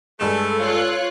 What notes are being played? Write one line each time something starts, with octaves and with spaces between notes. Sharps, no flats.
G2 G#3 A3 A4 E7
F4 C#5 F#6